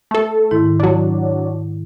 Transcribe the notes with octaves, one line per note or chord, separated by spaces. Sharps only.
A3 A4
G#2 D#3 E4
F#3 D4